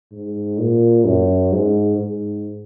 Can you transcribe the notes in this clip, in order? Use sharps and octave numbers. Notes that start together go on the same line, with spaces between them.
G#2
A#2
F#2
G#2
G#2